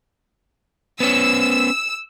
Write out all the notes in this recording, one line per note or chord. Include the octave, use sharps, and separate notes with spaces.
B3 C#4 E6